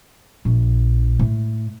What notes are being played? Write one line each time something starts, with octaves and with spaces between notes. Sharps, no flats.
A#1
A2